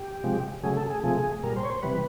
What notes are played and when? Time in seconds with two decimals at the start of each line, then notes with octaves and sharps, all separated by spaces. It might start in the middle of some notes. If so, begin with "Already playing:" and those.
Already playing: G4
0.24 C3 F3 G#3
0.63 C#3 F#3 A3 G#4
0.77 A4
0.90 G#4
1.03 C3 F3 A3 G#4
1.43 A#2 G3 A#4
1.56 C5
1.63 C#5
1.70 C5
1.83 C3 E3 G3 B4